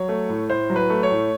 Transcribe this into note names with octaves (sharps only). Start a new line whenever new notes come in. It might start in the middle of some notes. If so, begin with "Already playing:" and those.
Already playing: F#3 C#5
A3
A2
A2 C5
F#3
B4
A3
C#5
A2